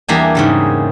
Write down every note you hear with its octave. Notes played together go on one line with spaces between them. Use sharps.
E2 G3 A#3 D4 G4 G#5
G#2 C#3 G3